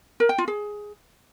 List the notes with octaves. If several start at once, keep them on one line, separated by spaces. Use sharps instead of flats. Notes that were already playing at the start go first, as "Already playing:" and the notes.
A#4
G5
F4
G#4